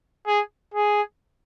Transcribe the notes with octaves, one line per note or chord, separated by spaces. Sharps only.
G#4
G#4